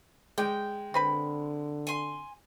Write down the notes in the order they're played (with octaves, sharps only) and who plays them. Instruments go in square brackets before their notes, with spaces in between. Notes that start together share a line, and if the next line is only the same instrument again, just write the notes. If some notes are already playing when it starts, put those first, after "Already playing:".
[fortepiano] G#3 [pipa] D5 [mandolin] G5
[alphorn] D3 [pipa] C4 B4 B5
[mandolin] G#5 C6